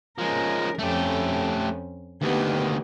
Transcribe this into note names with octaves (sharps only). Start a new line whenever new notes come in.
F3 G#3 C#4 A#4
F2 A3 C#4 G4
D2 D#3 A#3 B3 G4